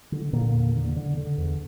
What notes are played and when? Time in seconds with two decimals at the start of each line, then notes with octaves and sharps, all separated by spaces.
0.12 D3
0.33 A#2 D3 A#3
0.54 E2
0.75 D3
0.96 D3
1.17 D3
1.38 E2